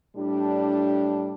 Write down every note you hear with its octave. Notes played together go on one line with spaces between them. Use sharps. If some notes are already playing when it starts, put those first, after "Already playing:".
A2 G3 D4 G4